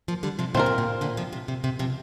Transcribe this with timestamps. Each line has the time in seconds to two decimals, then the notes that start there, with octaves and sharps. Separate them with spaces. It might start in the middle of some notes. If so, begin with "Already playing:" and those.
0.08 F3 A#3
0.23 D3 G3
0.39 C3 F3
0.55 A#2 D3 C4
0.57 F4 A#4
0.66 C3
0.78 A#2
1.01 A#2 D3
1.17 C3 F3
1.33 C3
1.48 C3
1.64 C3
1.79 C3 F3